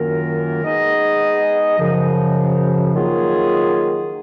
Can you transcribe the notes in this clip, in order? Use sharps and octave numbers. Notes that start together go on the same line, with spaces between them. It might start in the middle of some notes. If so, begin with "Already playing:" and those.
Already playing: F#2 D#3 A#3 F4 A#4
G#3 B3 D#4 G#4 D#5
F#2 C#3 F3
D#3 F#3 A#3 F4 G#4